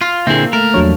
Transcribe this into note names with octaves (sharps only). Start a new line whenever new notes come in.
F4
A#2 D3 A#3 C4 E4 G#4 E5
A3 A#4
E2 F3 F#3 D4 C#5